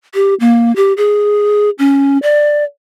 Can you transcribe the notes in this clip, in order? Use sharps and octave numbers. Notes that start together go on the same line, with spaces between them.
G4
A#3
G4
G#4
C#4
D5